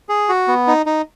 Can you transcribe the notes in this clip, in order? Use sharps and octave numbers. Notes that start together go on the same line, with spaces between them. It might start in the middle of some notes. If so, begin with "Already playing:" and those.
G#4
F#4
B3
D#4
D#4